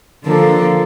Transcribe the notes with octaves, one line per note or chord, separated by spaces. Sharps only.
D3 F3 A#3 D4 A4